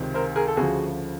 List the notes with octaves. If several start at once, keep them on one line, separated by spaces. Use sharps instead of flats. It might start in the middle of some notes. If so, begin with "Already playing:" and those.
Already playing: C#2 C3 D#3
A#4 C5
G#4 A#4
A4
D2 C#3 F3 F#4 G#4